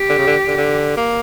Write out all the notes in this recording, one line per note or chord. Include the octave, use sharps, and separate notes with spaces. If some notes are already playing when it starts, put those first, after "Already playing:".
Already playing: G4
D3
C#3
D3
D3
D3
A#3